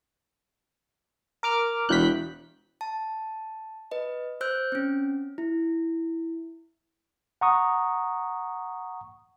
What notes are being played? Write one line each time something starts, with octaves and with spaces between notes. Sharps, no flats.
A#4 D6 F6
E1 F#6 G6 B6
A5
B4 D#5
C5 E6 F#6 G6
C4 C#4
E4
F#5 A#5 C#6 D#6